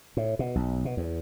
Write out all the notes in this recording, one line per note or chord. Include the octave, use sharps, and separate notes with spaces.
A2
B2
B1
B2
E2